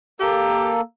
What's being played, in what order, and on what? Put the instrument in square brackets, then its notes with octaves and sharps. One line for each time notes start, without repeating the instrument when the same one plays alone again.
[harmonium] A#3 A4 [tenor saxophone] G4